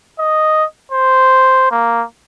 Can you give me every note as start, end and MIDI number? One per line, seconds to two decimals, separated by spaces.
0.19 0.64 75
0.92 1.69 72
1.71 2.04 58